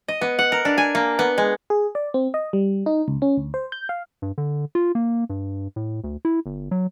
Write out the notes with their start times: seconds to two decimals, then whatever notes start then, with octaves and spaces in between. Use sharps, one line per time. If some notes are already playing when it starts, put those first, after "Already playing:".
0.08 D#5
0.21 B3
0.39 F#5
0.52 A#4
0.65 D4
0.77 G#5
0.95 A#3
1.19 B3
1.38 G#3
1.70 G#4
1.95 D5
2.14 C4
2.34 D#5
2.53 G3
2.86 D#4
3.08 C#2
3.22 C#4
3.37 D2
3.54 C5
3.72 G6
3.89 F5
4.22 G2
4.38 D3
4.75 F4
4.95 A#3
5.30 G2
5.76 A2
6.04 D2
6.25 E4
6.46 G1
6.71 F#3